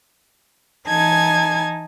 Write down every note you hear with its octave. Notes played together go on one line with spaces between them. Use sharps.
E3 D#4 G#5 A5 G#6